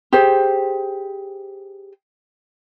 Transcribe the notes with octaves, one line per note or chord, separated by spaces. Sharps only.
G4 G#4 C5